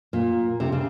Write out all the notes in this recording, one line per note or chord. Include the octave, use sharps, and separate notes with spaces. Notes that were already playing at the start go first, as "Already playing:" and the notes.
A#2
C3
C#3